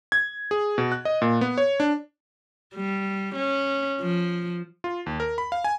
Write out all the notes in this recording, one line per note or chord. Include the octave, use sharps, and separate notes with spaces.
G#6
G#4
B2
F#6
D#5
A#2
B3
C#5
D4
G3
C#4
F3
F4
D#2
A#4
B5
F5
G#5